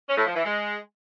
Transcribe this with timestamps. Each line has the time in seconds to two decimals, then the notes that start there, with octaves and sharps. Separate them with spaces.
0.08 C#4
0.17 A2
0.26 F3
0.35 E3
0.44 G#3